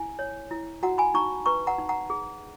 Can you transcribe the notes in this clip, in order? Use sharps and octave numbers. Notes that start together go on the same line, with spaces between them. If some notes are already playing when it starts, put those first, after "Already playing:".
Already playing: E4 G#5
C#5
E4
F#4 F#5 A#5
G#5 B5
D#4 A#5 C#6
B4 A#5 C#6
F#5 A#5
D#4
F#5 A#5
G#4